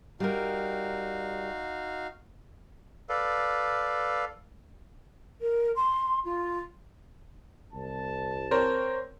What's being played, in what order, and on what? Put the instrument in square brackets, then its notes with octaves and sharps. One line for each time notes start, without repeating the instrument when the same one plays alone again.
[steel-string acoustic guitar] G3 A#4 [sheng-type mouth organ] D#4 F#4 F5
[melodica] A4 B4 D5 F5
[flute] A#4
C6
F4
[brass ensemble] C2 A5
[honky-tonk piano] C4 A#4 C#5 [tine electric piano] C5